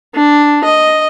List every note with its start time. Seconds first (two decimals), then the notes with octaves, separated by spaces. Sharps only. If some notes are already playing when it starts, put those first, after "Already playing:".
0.15 D4
0.64 D#5